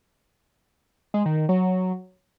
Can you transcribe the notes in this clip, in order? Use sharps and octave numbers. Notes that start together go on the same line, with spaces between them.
G#3
D#3
D#3
F#3